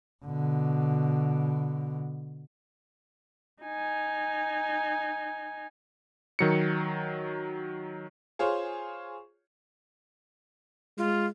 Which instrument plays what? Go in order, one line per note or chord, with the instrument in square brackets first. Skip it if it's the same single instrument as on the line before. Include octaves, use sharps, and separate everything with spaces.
[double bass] B2 D3
[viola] D#4 G#5
[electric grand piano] D#3 F#3 C#7
[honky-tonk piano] F4 G#4 C5 C#5
[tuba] G#3 [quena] F4